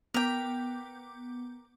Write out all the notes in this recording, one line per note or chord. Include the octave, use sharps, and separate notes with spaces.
B3 A#4 G5 D6 G6